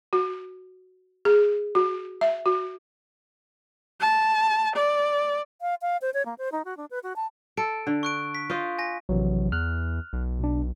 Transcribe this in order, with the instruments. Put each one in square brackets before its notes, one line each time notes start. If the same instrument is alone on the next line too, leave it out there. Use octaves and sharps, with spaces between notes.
[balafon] F#4
G#4
F#4
E5
F#4
[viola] A5
D5
[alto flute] F5
F5
C5
C#5
A#3
C5
D#4
F#4
D4
B4
F#4
A5
[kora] A4 [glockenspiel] D7
[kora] D3
[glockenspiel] C#6 F#6 D7
B6
[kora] F4 C5 D#5
[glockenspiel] G#5 A#6
[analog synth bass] A#1 [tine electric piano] C3 E3 F#3
[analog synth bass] E2 [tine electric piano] F6 F#6
[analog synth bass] B1
[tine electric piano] B2 D4